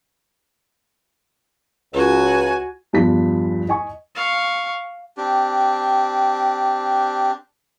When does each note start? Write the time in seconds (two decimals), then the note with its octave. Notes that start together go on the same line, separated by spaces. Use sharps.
1.93 C#2 F#4 G#5
2.93 E2 G2 F3 B6
3.69 D#5 G#5 C#6
4.15 F5 C#6
5.17 C4 D4 G4